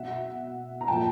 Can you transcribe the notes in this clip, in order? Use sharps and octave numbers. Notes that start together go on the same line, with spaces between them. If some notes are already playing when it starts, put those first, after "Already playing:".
Already playing: B2 E5 F#5
A#5
A#2 F3 G5 A5